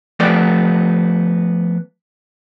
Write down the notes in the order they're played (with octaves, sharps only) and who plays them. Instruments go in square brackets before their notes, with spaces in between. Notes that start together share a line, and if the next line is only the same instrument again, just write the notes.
[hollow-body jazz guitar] F3 A3 B3 A4 D5 G5